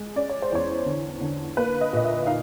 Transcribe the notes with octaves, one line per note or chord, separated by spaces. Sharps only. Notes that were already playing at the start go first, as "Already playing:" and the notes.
Already playing: G#3
C#4 D5
C#5
C5
E2 C#5
D3
D3
A#3 B4
D#5
A#2 D#5
E5
D#4 F5